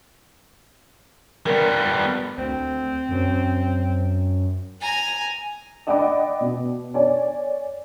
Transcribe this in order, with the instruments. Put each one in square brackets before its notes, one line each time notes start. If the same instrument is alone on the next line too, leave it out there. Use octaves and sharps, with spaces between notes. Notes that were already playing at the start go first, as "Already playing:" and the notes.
[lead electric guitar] G3 B3 [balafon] A#4
[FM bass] D2 [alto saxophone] C4
[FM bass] F#2
[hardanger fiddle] G#5 A#5
[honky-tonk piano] D5 D#5 F#5 G5 B5 D6
B2
C#5 D5 G#5